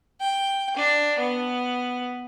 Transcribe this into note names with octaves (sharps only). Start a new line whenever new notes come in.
G5
D4
B3